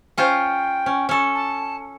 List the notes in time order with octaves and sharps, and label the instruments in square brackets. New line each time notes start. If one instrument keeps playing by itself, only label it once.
[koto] C#4 F4 C5 [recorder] G5
[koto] C#4
C#4 A4
[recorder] A5